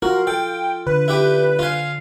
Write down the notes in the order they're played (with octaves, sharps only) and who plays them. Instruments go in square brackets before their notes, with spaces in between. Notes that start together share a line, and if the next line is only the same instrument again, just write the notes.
[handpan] F4 [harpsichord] F#4 [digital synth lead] A#4
[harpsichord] A4 [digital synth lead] G5
[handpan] D3 [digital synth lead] B4
[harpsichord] E4 G4 G5
[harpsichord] F4 G#5 [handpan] F5